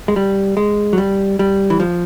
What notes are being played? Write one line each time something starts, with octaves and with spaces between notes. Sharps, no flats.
G#3
G3
G#3
F#3
G3
G3
E3
F3